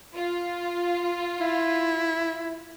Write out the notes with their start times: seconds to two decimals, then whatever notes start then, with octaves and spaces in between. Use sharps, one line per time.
0.15 F4
1.40 E4